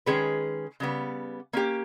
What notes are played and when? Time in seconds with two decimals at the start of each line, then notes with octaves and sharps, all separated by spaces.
0.06 D#3 G#3 C#4 G#4 B4
0.80 C#3 G3 B3
1.53 A#3 C#4 G4